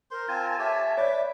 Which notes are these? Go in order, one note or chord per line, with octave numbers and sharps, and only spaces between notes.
A#4 C5 C6
C4 F4 G#5 A5
G4 A4 C#5 E5
B4 C#5 D5 D6